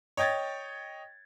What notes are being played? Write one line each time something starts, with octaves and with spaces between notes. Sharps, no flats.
C#5 D#5 G5 G#6 A6